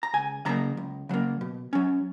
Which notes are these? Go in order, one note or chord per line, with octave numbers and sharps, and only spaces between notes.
A#5
C#2 G#5
C#3 F#3 A#3 A#5
C#2
C#3 F#3 A#3
B2
F#3 C#4